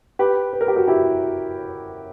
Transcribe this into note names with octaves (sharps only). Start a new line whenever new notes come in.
G4 B4
B4
A#4
G4
F#4 A#4
E4 G4